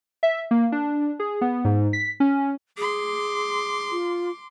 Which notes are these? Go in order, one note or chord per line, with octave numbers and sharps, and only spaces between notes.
E5
A#3
D4
G#4
B3
G#2
B6
C#4
G#4 C6 D6
F4